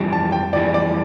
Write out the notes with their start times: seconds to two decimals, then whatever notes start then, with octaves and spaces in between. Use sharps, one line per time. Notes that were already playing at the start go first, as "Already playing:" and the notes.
Already playing: F2 E3 G3
0.13 A5
0.32 G5
0.53 F2 E3 G3 D5
0.74 D5